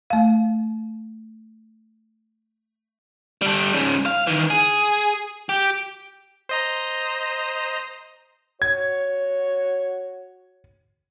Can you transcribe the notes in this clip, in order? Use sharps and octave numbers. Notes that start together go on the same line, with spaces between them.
A3 F5
G3 A4
G#2 C#3
F5
D#3 E3
G#4
G4
C5 D#5 A#5
F#4 C#5 G#6